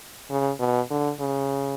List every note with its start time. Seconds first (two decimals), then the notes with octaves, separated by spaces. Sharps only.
0.30 C#3
0.60 B2
0.90 D3
1.20 C#3